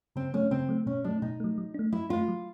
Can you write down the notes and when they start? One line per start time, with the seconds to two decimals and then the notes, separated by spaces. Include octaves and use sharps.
0.16 C#3 C4
0.34 F#3 A3 C#4
0.51 C#3 C4
0.69 F#3 A3
0.86 B2 C#4
1.04 F#3 A3 D4
1.22 B2 D#4
1.40 F#3 A3
1.58 F#3
1.74 A3 D4
1.93 F#3 E4
2.09 A3 D4 F4
2.28 F#3